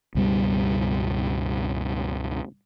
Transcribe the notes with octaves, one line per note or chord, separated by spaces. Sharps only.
C#2 G2 B2 G3